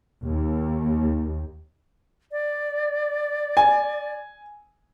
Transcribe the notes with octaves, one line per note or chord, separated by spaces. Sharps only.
D#2
D5
G#5